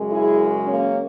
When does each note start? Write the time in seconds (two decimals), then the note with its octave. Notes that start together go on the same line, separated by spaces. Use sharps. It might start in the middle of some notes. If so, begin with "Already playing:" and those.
Already playing: F#2 C#3 G#3
0.10 E4 G#4
0.67 A#3 C#4